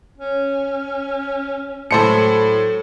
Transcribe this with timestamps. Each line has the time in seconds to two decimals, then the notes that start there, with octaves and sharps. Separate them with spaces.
0.18 C#4
1.91 A2 F#3 A4 C5 A5 C#7